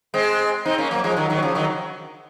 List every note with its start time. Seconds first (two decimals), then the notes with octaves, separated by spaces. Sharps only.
0.14 G#3 C4
0.66 C4 D#4
0.78 A#3 C#4
0.91 F#3 A#3
1.04 F3 G#3
1.16 D#3 F#3
1.30 D#3 F#3
1.43 C#3 F3
1.55 D#3 F#3